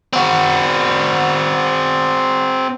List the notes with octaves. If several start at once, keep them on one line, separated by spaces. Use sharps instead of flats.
C4 F#4